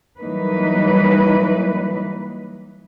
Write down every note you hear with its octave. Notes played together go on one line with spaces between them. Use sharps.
E3 F#3 G3 A#3 D#4 B4